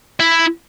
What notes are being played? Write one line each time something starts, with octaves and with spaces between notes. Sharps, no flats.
E4